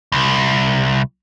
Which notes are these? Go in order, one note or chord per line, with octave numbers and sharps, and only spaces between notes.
C2